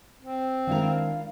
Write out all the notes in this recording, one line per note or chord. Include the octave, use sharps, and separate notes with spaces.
C4
D#3 G#3 D4 E4 A#4 F5